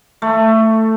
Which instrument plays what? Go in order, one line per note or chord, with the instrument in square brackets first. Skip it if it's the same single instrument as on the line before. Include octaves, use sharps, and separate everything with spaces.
[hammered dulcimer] A3